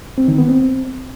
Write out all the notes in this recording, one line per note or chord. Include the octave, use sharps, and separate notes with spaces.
C4
D#3
B3
C4